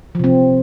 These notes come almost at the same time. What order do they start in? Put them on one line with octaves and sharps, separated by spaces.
F3 C3 C4